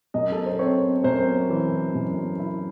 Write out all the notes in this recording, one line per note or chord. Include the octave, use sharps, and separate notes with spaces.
F#2 D#5
A4
C5
C4 C#5
F#2 C5
E3
F#2
E4